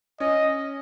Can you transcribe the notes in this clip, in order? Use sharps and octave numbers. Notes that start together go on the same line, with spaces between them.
C#4 D#5